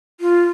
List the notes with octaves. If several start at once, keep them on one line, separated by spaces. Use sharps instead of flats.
F4